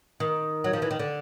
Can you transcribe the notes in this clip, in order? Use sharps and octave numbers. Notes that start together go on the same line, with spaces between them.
D#3
F#3
F3
E3
D#3
D3